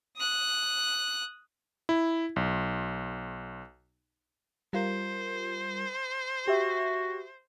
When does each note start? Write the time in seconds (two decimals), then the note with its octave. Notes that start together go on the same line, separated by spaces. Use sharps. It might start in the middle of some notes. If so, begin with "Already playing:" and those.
0.17 D#6 F#6
1.89 E4
2.36 B1
4.73 G3 F4 A#4 C5
6.48 F#4 G4 E5